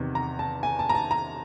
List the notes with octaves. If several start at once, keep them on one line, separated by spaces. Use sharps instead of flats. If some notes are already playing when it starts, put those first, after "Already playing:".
Already playing: E2 C3 D#3
A#5
A5
G#5
A5
A#5
A5
A#5